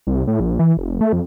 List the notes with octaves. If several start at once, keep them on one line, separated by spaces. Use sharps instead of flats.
C2
A2
A#1
E3
F1
A3
F2